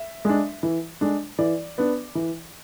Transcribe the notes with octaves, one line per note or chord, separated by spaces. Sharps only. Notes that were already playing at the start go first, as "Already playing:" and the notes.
Already playing: E5
G#3 D4
E3
G#3 D4
E3 D5
B3 D4
E3